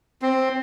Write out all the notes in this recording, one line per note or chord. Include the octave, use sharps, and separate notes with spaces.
C4